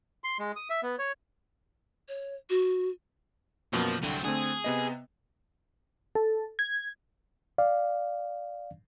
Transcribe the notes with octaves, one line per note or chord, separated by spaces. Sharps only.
C6
G#3
D#6
E5
B3
C#5
C#5
F#4
F#2 B2 F3 A#3
C2 D3 F#3 C4 D#7
D3 A3 C4 G#4
C3 B3 D#5
A4
G#6
D5 F5